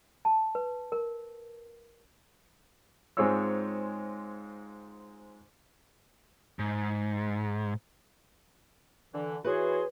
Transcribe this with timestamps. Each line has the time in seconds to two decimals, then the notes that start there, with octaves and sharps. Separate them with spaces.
0.25 A5
0.55 B4
0.92 A#4
3.17 G#2 G#3 C4 F4 C#5 E6
6.59 G#2
9.14 D3 E3
9.44 E3 F#4 G#4 B4 C#5 C6